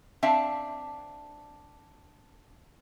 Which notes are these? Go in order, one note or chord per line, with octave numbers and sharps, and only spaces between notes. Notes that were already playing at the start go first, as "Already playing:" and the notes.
C4 D4 E5 F5 A5